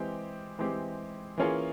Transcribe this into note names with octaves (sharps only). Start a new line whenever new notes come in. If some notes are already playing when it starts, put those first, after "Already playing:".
Already playing: E3 G#3 C4 G4
E3 G#3 C4 G4
E3 A#3 C#4 F4 G#4